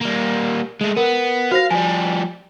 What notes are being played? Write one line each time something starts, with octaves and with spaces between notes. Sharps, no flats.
G3 A#3
G#3 A3
B3 A#4
F#4 C5 F5 A#6
F3 G3 G#5